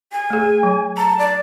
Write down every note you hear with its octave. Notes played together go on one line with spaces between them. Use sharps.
G#5
A3 G#4
F#3
A5 A#5
D5